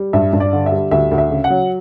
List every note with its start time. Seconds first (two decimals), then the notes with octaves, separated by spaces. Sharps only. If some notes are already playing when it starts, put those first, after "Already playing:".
Already playing: G3
0.13 G2 E5
0.33 G2
0.40 D5
0.53 D3
0.66 E5
0.72 G3
0.91 D2 E5
1.11 D2
1.18 E5
1.31 C#3
1.44 F#5
1.50 F#3